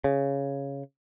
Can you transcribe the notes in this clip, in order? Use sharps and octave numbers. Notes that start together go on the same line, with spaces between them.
C#3